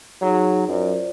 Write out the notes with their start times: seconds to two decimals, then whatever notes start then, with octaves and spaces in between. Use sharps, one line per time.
0.22 F#3 D#4 G#4
0.68 F#2 F4 C5 D5